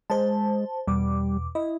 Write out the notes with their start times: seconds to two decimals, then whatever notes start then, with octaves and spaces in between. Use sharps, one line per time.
0.10 G#3 C5 A5
0.87 E2 B2 G3 D6
1.55 E4 D#5